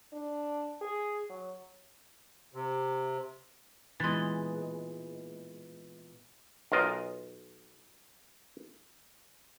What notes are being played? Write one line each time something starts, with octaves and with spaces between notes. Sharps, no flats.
D4
G#4
F#3
C3
A#2 E3 G#3 B3 C6 A6
B1 F4 A#4 D#5